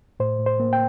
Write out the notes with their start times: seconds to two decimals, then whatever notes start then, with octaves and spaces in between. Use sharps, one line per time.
0.20 A2 C5
0.39 A2
0.46 C5
0.60 A#3
0.73 G5